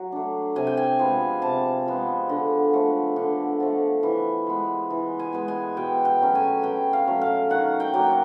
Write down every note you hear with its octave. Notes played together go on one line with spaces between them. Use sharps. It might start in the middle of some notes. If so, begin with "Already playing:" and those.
Already playing: F#3
A3 D4
C3 G#5
G5
G#5
F3 G#3 B3
C3 A5
F3 G#3 B3
D3
F3 A3
D3
F3 A3
E3
G#3 B3
E3
G#5
G#3 B3
G#5
B2 G5
G5
F#3 A3 C#4
G#5
B2 G5
F5
F#3 A3 C#4
F5
D#3 F#5
G5
F#3 A#3